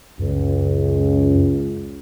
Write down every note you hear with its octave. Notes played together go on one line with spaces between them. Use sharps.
C#2 F#2